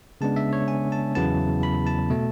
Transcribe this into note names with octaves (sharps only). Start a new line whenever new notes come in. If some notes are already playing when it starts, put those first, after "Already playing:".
C#3 G#3 B3 D4 A5
E5
C#5
G#5
A5
E2 C#3 F#3 B3 E4 A5
B5
A5
B2 A3